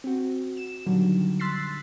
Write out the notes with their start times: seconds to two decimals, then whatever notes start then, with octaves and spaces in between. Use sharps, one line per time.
0.04 C4 F#4
0.57 E7
0.86 A#2 D3 D#3 F#3 G3
1.39 C6 E6 F#6 A6 B6 C7